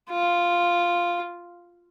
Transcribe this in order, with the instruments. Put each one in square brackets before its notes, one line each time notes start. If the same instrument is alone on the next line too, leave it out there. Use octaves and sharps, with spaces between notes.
[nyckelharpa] F4